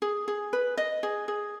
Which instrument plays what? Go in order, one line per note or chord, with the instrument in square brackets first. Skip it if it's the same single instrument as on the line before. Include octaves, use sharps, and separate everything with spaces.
[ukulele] G#4
G#4
B4
D#5
G#4
G#4